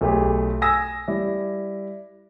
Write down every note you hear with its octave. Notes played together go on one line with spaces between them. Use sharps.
B1 A3 G4 G#4
G#5 D#6 E6 A#6
G3 E4